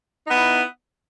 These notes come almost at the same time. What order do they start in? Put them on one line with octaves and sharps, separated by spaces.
D#4 B3 E4